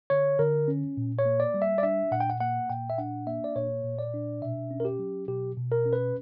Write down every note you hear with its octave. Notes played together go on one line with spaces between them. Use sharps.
D3 C#5
D3 A#4
C#4
A#2
C#5
A#3
D5
G3
E5
D5
D4 E5
A#2 F#5
G5
F#5
A#3 F#5
A#2 G5
E5
D4 F#5
A#3 E5
D5
A#2 C#5
A#2
D5
D4
B2 E5
C#4
A#4
G4
F#3
B2 G4
B2
A#4
C#4
B4